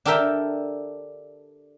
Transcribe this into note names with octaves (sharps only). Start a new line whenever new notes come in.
D4 G4 A4 A#4 E5 G5